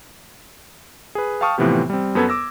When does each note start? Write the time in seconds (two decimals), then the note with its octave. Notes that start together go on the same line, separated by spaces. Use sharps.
1.15 G#4 B4
1.41 F5 G5 A5 C#6 D#6 F6
1.58 A2 C3 E3 F3 B3 G4
1.90 G3 C4
2.15 F#2 B3 A4 B4 G#6
2.29 D6 E6 A#6